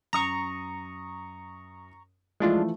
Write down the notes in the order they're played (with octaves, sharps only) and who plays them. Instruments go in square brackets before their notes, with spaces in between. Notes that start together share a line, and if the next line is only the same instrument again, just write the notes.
[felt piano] F#2 D#6 [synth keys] A#5 C#6
[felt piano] E3 F3 A3 [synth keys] G#3 D4 F4